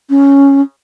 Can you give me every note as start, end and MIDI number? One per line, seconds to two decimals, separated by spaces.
0.10 0.61 61